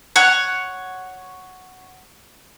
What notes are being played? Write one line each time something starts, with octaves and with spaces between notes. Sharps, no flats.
C#5 F#5